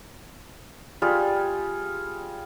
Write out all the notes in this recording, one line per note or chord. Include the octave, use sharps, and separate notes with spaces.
G3 F4 G#4